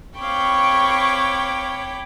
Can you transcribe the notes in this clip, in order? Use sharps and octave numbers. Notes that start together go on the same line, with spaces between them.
C4 C#5 F5 G5 B5 C#6 D6